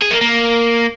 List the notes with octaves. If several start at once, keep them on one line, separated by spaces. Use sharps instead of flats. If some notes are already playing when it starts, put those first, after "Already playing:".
G#4
A#3
A#3